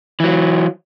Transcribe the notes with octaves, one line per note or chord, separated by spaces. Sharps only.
E3 F#3